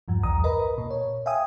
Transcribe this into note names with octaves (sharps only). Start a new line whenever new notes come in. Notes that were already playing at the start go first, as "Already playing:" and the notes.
E2 G2 F3
B1 E2 A#5 D#6
A#4 B4 D#5 A#5 B5
A#2
C#5
E5 F5 G5 G#5 D#6